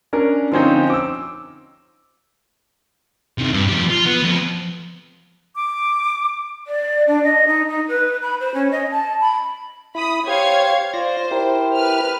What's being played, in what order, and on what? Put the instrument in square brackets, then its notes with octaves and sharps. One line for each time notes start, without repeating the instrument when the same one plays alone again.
[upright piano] C#4 D4 A#4
D3 F3 C4 C#4 D#4
D6 E6
[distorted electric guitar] C3 D#3
G2
F3 G4
F4
B3
F2
[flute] D6
[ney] D5
D4
D#5
D#4
D#4
B4
B5
C5
C#4
D#5
A5
B5
[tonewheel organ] E4 [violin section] B5 D#6
[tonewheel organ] G4 C5 [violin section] C#5 F5 G#6
[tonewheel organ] F4 D5 A#6 [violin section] C5
[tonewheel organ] E4 G4 A#4
[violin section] B4 F6